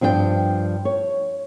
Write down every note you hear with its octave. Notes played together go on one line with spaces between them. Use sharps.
G2 F3 D4 A4 G5
C#5